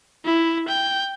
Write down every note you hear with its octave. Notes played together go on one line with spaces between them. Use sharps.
E4
G5